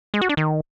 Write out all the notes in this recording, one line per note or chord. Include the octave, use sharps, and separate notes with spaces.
G#3
F#4
D4
D#3